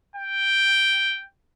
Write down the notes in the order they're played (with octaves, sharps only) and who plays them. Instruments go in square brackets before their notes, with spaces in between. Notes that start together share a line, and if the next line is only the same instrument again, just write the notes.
[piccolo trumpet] G5